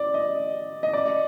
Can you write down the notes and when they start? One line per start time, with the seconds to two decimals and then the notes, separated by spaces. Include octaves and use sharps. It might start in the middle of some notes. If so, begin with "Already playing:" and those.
Already playing: D5
0.14 D#5
0.83 D#5
0.94 D5